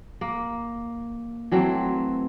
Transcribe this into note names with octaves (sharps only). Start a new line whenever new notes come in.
A#3
E3 F#3 A3 C4